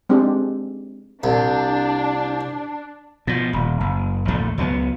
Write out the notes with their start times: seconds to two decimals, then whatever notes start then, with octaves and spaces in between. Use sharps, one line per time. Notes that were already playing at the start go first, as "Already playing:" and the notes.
0.09 G#3 C4 D4 G4
1.24 C2 D4
3.27 B2 F3
3.53 D#1
3.80 F#1
4.28 A#1 E2 F3 A3
4.58 C#2 F#3 G3 B3